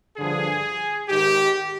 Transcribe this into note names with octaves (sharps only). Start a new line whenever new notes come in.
G2 D3 F3 G#4
G#2 D#3 G4